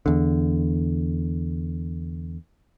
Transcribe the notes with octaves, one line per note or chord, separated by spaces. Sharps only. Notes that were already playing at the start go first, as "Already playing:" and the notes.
E2 D3